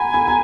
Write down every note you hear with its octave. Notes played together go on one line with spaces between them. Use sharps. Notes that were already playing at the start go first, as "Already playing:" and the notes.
Already playing: F#5 G#5 A#5 B5
B5
A#5